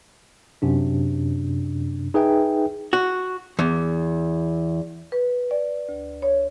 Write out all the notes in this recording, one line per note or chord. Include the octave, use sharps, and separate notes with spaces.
F#2 C3 D4
D#4 G#4 B4 E5 G5
F#4
E2
B4
D5
D2
C#5